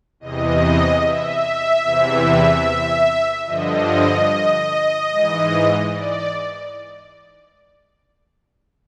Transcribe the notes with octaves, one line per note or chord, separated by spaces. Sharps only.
E2 C3 E3 D#5
E5
E2 C3 E3
G2 D3 F3 D#5
G#2 E3
D5